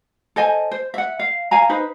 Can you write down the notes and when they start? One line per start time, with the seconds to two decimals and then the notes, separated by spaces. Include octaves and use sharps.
0.36 A4 C5 D#5 G#5
0.71 C5
0.94 E5 F#5
1.19 F5
1.51 C#5 F5 G#5 A#5
1.69 D#4 B4 C5